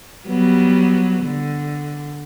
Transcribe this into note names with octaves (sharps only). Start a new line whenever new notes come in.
F#3 G3 B3
D3